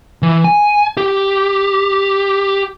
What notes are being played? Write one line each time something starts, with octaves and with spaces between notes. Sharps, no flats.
E3
G#5
G4